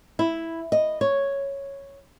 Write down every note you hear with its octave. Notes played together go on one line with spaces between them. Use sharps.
E4
D#5
C#5